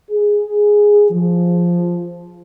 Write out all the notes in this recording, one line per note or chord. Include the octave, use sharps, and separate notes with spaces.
G#4
F3